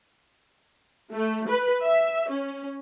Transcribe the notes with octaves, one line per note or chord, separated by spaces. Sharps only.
A3
B4
E5
C#4